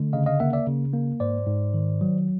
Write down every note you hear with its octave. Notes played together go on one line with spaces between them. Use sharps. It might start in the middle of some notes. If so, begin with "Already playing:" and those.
Already playing: D3 A3
C#3 D#5 F5
D#5 F5
A#3 E5 F#5
D5 E5
C#3
A#3
G#2 C5 D5
G#2
D#3
F#3